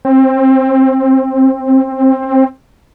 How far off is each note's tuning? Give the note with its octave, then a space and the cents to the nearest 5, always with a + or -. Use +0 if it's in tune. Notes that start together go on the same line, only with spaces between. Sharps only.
C4 +20